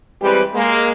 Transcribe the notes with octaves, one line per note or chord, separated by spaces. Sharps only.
E3 G3 G#3 C4 G4 B4
G#3 A#3